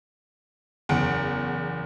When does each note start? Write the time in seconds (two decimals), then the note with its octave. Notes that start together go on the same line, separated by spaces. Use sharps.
0.89 F#1 E2 F#5 D7